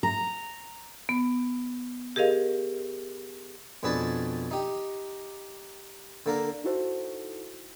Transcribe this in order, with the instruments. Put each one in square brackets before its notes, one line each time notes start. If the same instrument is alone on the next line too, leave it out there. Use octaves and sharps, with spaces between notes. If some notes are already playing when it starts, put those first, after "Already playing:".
[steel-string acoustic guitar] A#5
[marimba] B3
G4 G#4 A#4 D#5 F5
[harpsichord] F2 B2 D4 G#4 B4 A5
D#4 G4
D3 A#3 A#4
[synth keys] D#4 E4 F#4 A4 C5